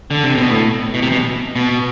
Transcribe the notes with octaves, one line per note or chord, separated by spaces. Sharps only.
D3
C3
B2
A2
B2
C3
B2
B2